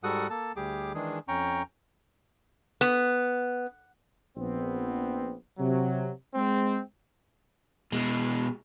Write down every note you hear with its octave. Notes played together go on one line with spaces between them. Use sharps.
G#2 G3 F#4 A4 F#5 D#6
A#3 A4 A5
D2 G3 G4 G#4 D6
D#3 E3 G#3 D4 G#4
F2 C#4 G5 A#5 C#6
B3
A#1 B3 C4
C3 F#3
G#3 C4
B2 G#3